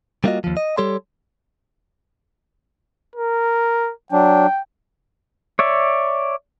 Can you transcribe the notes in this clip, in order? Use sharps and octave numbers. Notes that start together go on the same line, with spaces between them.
G3 A#3 D#4 F4 F#4 D#5
D#2 F3
D#5
G3 G4 A4 C#5 C6
A#4
F#3 D4 G5
C#5 D5 E5